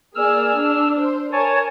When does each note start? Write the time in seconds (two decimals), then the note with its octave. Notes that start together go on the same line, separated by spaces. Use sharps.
0.15 A#3 G#4 D5 E6 F6
0.56 D4
0.97 C5
1.32 A#4 C#5 G#5 A5